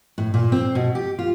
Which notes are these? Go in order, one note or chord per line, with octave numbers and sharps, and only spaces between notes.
A2
A#2
C4
B2
G4
F4